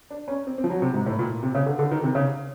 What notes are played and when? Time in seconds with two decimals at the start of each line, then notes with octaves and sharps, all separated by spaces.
0.11 D4
0.28 C#4
0.47 C4
0.58 C4
0.64 F3
0.70 F#3
0.82 C3
0.94 G#2
1.06 A2
1.19 A#2
1.43 C3
1.55 C#3
1.66 D3
1.79 D3
1.91 D#3
2.03 C3
2.15 C#3